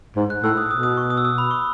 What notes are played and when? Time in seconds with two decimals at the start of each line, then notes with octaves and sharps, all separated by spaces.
0.16 G#2
0.30 F#6
0.43 A2 E6
0.57 D#6
0.70 B2 D#6
0.83 D#6
0.97 C#6
1.10 D#6
1.17 E6
1.25 D#6
1.38 B5
1.51 C#6